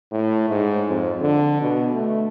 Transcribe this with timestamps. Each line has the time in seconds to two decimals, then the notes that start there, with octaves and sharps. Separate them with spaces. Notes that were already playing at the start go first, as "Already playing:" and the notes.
0.12 A2
0.49 G#2
0.89 F2
1.21 D3
1.61 B2
1.94 A3